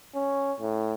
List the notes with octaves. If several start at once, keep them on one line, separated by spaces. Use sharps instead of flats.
C#4
A2